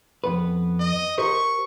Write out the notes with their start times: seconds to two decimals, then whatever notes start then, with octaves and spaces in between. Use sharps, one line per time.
0.24 F2 B3 B4
0.79 D#5
1.18 G4 A#4 C5 C#6